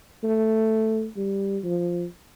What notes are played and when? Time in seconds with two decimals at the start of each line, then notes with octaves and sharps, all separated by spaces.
0.24 A3
1.17 G3
1.64 F3